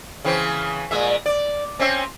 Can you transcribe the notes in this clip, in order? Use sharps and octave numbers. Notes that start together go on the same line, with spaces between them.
C#3 E3 C4
A#2 G#3 E5
D5
C4 C#4 E5